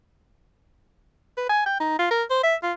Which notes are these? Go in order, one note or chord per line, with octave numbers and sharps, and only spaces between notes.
B4
G#5
G5
D#4
F4
A#4
C5
E5
F4